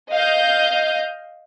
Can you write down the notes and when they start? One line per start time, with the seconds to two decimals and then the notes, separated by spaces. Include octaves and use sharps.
0.11 D#5 F5 G6